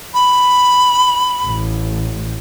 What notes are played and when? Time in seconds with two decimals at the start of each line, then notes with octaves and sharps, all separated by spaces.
0.14 B5
1.45 A1